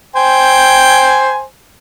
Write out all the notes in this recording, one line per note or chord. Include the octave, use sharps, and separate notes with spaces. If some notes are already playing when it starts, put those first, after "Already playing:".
C5 G5 G#5